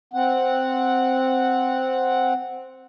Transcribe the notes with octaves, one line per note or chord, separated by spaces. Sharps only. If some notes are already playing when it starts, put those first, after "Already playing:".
C4 F#5